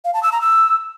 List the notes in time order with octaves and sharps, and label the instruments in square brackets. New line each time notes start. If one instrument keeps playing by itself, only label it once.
[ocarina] F5
A5
E6
A#5
E6